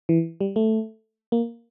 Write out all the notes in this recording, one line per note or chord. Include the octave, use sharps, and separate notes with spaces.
E3
G3
A3
A#3